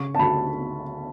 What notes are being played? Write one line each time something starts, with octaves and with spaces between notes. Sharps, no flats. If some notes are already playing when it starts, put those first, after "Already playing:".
Already playing: C#3 C#6
A5
D2 B5